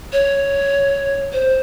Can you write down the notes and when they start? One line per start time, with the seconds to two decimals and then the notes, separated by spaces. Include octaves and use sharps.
0.13 C#5
1.33 C5